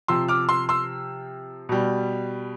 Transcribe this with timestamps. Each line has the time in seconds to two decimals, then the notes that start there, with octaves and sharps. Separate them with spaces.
0.08 C3 F3 C6 E6
0.28 D6 F6
0.49 C6 E6
0.69 C6 E6
1.69 B2 G3